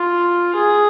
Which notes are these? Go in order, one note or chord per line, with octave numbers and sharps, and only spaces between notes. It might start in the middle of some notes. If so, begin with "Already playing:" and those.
Already playing: F4
G#4